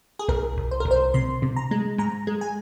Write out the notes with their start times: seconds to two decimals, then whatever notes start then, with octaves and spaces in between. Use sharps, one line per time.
0.19 G#4
0.29 C2 A#4
0.57 C2
0.71 C5
0.80 A#4
0.85 C2
0.91 C5
1.14 C3 C6
1.42 C3
1.56 A#5
1.71 G#3
1.98 G#2 A#5
2.27 G#3
2.41 G#5